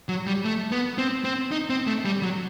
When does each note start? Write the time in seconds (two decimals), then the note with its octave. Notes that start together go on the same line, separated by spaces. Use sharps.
0.09 F#3
0.27 G3
0.45 A3
0.71 B3
0.98 C4
1.24 C4
1.51 D#4
1.70 C4
1.87 A3
2.05 G3
2.23 F#3